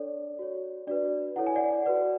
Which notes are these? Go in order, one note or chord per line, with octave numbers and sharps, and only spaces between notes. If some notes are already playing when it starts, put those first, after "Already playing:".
Already playing: D4 A4 C#5 D5
F#4 C#5
D4 F#4 B4 D5
E4 A4 C#5 F#5
G#5
D5 F#5
F#4 B4 D5